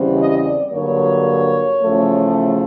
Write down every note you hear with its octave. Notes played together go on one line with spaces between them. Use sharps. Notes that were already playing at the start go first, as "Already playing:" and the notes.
Already playing: E2 C#3 E3 G3 C4
D#5
D5
G2 D3 F#3 A#3 C#5
E2 C#3 F3 A3